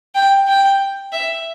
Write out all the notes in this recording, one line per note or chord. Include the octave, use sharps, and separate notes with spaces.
G5
G5
E5